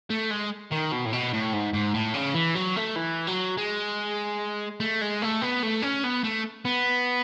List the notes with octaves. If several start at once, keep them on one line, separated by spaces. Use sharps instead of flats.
A3
G#3
D#3
B2
A2
B2
A2
G#2
G#2
A2
C#3
E3
F#3
A3
E3
F#3
G#3
A3
G#3
A3
B3
A3
C#4
B3
A3
B3